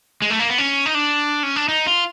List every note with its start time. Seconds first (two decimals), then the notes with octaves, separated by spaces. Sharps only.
0.22 G#3
0.30 A3
0.39 A#3
0.50 B3
0.58 C#4
0.86 D#4
0.95 D4
1.43 C#4
1.56 D4
1.68 D#4
1.87 F4